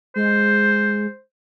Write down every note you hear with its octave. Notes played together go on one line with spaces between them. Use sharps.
G#3 C5